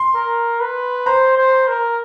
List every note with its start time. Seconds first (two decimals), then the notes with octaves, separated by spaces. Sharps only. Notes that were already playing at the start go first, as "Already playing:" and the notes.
Already playing: C6
0.15 A#4
0.60 B4
1.06 C5 A#5
1.37 C5
1.68 A#4